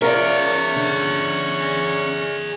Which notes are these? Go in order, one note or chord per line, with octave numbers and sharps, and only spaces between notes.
C#4 F4 G#4 A#4 D5 E5
D3